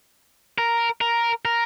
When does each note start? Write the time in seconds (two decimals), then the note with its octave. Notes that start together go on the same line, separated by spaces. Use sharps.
0.58 A#4
1.01 A#4
1.45 A#4